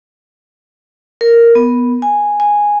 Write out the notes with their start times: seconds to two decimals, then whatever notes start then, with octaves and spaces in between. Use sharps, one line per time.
1.21 A#4
1.55 B3
2.02 G#5
2.40 G#5